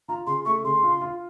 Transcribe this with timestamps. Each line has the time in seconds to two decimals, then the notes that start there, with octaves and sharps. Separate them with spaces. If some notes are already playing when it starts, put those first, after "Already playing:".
0.09 F4 A#5
0.27 C#3 C6
0.45 A3 C#6
0.64 C#3 C6
0.83 F4
1.01 F4